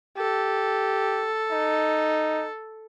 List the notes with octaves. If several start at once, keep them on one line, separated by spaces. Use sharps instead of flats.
G4 A4
D#4